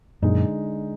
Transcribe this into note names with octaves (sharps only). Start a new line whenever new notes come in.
F#2 A#2 D3 G#3 D#4